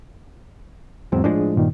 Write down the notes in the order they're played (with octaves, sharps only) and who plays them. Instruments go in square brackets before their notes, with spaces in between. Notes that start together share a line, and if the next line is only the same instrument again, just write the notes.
[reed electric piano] E2 F#3 C4 [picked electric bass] G#2
[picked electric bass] A2 F3 G#3 [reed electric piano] D4 G#4
[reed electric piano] G2 A#2 D#3